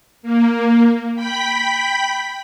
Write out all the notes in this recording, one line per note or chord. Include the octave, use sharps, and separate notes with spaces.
A#3
G5 B5 B6